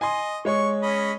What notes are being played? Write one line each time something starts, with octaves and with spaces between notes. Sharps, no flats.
D#5 G#5 C6
G#3 C#5 C#6
C#4 D#5 B5